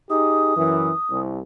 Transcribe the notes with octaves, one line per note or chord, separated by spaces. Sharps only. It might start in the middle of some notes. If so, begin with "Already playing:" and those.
D#4 G4 G#4 D#6
F#2 E3
C2